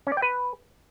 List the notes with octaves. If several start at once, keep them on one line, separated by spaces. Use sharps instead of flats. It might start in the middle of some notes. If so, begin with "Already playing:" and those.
C#4
D5
G5
B4